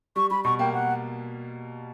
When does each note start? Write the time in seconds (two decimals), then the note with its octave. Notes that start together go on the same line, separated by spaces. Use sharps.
0.16 G3 C#6
0.31 G3 B5
0.44 B2 C#6
0.59 A#3 G5
0.73 A#3 F#5